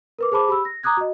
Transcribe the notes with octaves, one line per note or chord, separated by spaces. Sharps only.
A#4 B4 D6
G#4 C5 A5 B5 D6
G4 B5 E6
A#6
A#5 D6 D#6 F#6 G#6
F#4 D#5